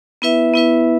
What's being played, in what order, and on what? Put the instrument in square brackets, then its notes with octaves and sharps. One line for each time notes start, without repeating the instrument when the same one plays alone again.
[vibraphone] B3 E4 B4 E5
B3 E4 B4 E5